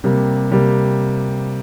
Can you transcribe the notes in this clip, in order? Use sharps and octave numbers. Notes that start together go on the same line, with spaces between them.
C3 G3 A#3
C3 G3 A#3